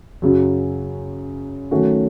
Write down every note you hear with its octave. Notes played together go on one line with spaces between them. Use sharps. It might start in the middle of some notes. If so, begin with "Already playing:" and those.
F#2 C#3 F#3
D#3 F#3 A3 C#4 F#4